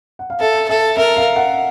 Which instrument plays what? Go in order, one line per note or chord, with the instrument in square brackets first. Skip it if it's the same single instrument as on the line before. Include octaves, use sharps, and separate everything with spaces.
[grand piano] F#5
F5
[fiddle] A4 [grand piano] E5
[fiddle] A4 [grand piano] E5
[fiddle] A#4 [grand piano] E5
[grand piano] F5
F#5